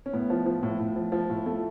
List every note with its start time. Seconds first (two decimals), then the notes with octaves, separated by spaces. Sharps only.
0.06 C#4
0.13 A2 B3
0.30 F3
0.46 F3
0.63 A2
0.80 A2
0.96 F3
1.12 F3
1.30 A2
1.46 A3